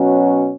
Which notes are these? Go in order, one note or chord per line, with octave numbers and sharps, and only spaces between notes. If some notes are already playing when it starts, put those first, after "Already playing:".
Already playing: B2 F#3 C#4